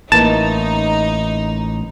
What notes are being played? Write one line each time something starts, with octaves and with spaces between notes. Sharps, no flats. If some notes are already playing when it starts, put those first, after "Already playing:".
A1 A#3 D#4 E4 B4 A5